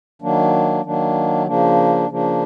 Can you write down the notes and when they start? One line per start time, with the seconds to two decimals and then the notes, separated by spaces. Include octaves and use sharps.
0.22 D#3 F#3 A#3 D4
0.84 D#3 F#3 A#3 D4
1.47 C#3 F3 A#3 D4
2.09 C#3 F3 A#3 D4